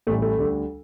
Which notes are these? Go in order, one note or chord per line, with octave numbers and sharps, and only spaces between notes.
A1 A2 E3 G3 A3
A3
D2 D3 G3